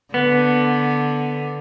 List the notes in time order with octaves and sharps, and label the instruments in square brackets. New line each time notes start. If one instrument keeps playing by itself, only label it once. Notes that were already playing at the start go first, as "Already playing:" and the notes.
[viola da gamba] D3 [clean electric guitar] B3